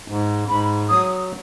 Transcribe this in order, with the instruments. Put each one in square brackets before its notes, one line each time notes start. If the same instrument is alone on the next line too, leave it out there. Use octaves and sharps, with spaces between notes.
[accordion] G#2
[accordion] G#2 [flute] B5
[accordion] F#3 [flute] D#6